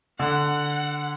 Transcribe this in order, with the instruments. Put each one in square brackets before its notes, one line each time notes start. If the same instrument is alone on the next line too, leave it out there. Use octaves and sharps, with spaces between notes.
[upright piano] D3 [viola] F#5